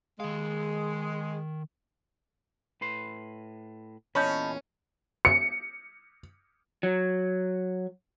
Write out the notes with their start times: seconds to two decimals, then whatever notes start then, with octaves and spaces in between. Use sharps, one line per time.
0.20 D#3 G#3 F5
2.81 A2 B4 C6
4.15 E2 A#2 C#4 D#5 A5 B5 C#6 G6
5.25 C#7
6.83 F#3